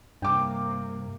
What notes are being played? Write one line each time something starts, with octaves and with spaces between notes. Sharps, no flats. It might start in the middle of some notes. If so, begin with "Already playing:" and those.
G2 C3 A#3 G5 D6